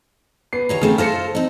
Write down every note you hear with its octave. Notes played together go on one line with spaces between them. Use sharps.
B3 C7
D#2 C#5 A#5
G#2 C#3 A3 C4
F4 A4 C5 F6 A#6 C#7
C4 D#4